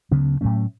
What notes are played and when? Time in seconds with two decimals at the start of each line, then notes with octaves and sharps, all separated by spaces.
0.11 D2 C#3 F#3 B3
0.41 A2 F#3 A3 C#4